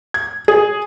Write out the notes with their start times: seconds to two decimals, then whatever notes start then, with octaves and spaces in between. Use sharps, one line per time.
0.14 G#6
0.48 G#4